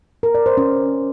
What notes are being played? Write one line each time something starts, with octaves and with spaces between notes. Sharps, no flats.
A#4
D5
C5
C#4